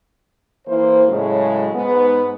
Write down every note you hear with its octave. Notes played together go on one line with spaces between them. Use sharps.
E3 A#3 E4 C5
A2 C#3 F#3 G#3
G#2 B3